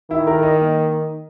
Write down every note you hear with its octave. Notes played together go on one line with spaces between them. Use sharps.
D#3 E4
A#4
D#5
A#3